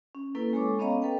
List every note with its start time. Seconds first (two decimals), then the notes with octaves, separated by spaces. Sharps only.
0.15 C#4
0.35 A#3 C#4 E4 A4 B4
0.53 G#3 A4 C#5 C#6 D6
0.79 B3 C#4 C#5 D#5 F5 A#5
1.02 A4 B4 G5